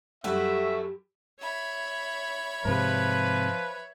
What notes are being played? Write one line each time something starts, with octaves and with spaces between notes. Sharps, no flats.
F#2 G3 A3 F#4 G4 E5
C#5 E5 B5
G#2 C3 F3 B4